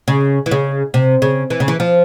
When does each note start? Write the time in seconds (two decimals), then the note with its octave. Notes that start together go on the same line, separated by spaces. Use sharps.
0.08 C#3
0.46 E3
0.51 C#3
0.94 C3
1.22 C#3
1.50 E3
1.60 C#3
1.68 E3
1.80 F3